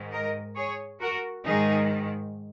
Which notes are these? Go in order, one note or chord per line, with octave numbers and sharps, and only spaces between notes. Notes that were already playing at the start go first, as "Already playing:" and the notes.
Already playing: G#2 D#3
A#4 D#5
G#4 C#5
F#4 A#4
G#2 D#3 D#4 G#4